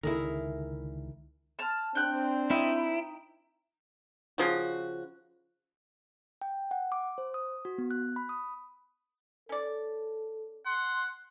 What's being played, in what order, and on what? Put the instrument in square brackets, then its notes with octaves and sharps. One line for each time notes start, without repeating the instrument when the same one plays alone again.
[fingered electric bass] C#2 D3 D#3 [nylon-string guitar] E4 G#4 A#4
[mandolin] A5 F6
[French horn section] C4 D4 [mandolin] G5 F#6
[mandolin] D#4 G5 [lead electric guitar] E4
[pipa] C#3 F3 F#4
[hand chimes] G5
F#5
D6
C5
D#6
F#4
B3
F#6
B5
D#6
[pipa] C#4 D5 [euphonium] A4
[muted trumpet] F#5 [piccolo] C6